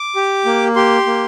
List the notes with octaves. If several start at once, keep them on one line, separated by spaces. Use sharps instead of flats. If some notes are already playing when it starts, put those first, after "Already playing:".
Already playing: D6
G4
A#3
G4 C6
A#3